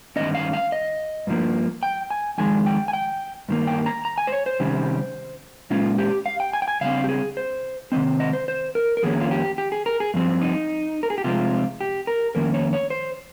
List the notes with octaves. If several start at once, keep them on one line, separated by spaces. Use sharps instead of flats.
G2 D#3 G#3 C#4 D#5
F5
F5
D#5
G2 F3 A#3
G5
G#5
F2 D#3 G#3 G#5
G5
G#5
G5
G2 D#3 A#3
G5
A#5
A#5
G#5
C5
C#5
C5
C3 D#3 G3 C#4
A#2 G#3 C#4 F4
G4
F5
G5
G#5
G5
G#5
C#3 G3 C4 F5
G4
G#4
C5
C3 D#3 G3 C4 D#5
D#5
C5
C5
A#4
A#4
F2 D#3 A#3 C#4 G#4
F4
G4
G4
G#4
A#4
G#4
G2 F3 C4
D#4
A#4
G#4
G4
C3 F3 G#3 C4 F4
G4
A#4
F2 D#3 A#3 C#4 A#4
C#5
C#5
C5